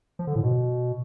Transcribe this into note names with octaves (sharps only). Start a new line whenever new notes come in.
F3
D3
A2
B2